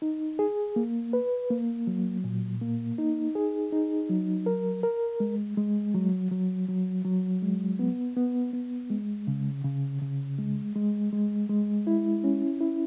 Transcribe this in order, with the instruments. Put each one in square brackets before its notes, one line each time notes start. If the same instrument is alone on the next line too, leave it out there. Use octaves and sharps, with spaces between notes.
[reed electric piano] D#4
G#4
A#3
B4
A#3
F#3
A#2
A#3
D#4
G#4
D#4
F#3
A#4
A#4
G#3
G#3
F#3
F#3
F#3
F#3
G#3
B3
B3
B3
G#3
C#3
C#3
C#3
G#3
G#3
G#3
G#3
E4
C#4
E4